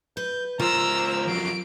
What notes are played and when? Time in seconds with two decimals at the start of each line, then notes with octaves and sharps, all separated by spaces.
0.17 B4 G6
0.60 C#2 F4 A#4 C5 A#5 E6
1.28 F2 F#3 C7 D7